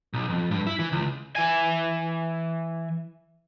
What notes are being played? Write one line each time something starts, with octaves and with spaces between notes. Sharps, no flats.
B1
F2
G2
E4
E3
C#2
E3 G#5